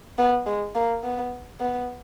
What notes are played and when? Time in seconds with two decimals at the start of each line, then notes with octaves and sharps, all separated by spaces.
0.18 B3
0.46 G#3
0.75 A#3
1.04 B3
1.60 B3